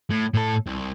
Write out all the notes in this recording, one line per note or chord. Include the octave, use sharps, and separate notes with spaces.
A2
A2 A4
C2